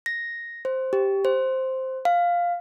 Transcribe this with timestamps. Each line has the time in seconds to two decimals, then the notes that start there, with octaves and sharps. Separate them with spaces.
0.06 A#6
0.65 C5
0.93 G4
1.25 C5
2.05 F5